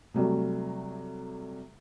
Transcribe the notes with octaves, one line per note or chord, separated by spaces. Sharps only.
C3 F#3 G3 A3